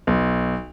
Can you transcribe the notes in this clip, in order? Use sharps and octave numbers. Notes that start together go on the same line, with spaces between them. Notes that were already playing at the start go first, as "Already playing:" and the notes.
B1